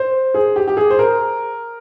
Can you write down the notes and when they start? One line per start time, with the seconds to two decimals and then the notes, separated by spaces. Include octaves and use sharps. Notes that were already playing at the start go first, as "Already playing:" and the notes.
Already playing: C5
0.34 G#4
0.56 G4
0.68 G4
0.77 G#4
0.90 C5
0.99 A#4